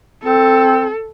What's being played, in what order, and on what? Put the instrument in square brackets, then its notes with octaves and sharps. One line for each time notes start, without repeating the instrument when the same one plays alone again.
[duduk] C4 [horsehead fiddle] A4